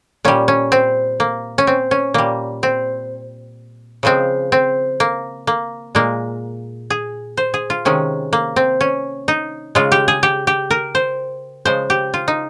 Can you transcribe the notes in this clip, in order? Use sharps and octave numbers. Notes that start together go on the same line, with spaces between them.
A#2 G3 C#4
C#4
C4
A#3
C#4
C4
C#4
A#2 G3 A#3
C4
C#3 F3 G#3 C4
C4
A#3
A#3
A#2 G#3 A#3
G#4
C5
G#4
F4
C3 D#3 G#3 C#4
A#3
C4
C#4
D#4
C#3 G#3 F4
G4
G#4
G4
G4
A#4
C5
C#3 F3 G#3 C5
G4
F4
D#4